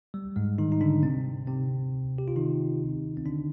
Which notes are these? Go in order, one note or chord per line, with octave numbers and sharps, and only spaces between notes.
G3
G#2 G#3
D#3 D#4
D#4
D3 D4
C3 C4
C3 C4
G4
F4
D#3 D#4
C4
D3 D4